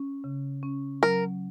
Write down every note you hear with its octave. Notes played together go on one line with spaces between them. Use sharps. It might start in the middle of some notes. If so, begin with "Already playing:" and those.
Already playing: C#4
C#3
C#4
F#3 A#4